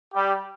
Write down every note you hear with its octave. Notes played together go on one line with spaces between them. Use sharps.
G3 G4